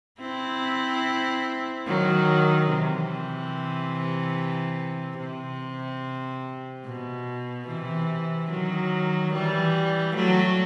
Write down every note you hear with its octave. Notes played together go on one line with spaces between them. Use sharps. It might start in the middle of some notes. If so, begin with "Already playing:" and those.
C4 E4
D#3 F#3
C3 E3
C3
B2
C3 E3
D#3 F#3
E3 G3
F#3 A3